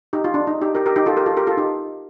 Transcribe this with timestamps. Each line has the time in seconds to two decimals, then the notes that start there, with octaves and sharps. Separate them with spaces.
0.13 D#4 G4
0.24 F4
0.34 D4
0.47 D#4
0.61 D#4 G4
0.75 G4 A#4
0.86 G4 A#4
0.96 D#4 G4
1.06 F4 A4
1.17 G4 A#4
1.26 F4 A4
1.37 G4 A#4
1.47 F4 A4
1.57 D#4 G4